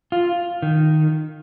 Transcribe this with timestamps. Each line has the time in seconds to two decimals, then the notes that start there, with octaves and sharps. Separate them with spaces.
0.12 F4
0.62 D#3